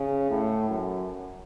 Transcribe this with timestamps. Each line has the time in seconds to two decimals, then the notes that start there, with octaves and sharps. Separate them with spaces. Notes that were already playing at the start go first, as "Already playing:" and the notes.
Already playing: C#3
0.30 A2
0.69 F#2